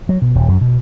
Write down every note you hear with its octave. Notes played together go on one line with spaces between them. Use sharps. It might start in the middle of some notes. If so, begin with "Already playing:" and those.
F#3
B2
D#1
F#2
B2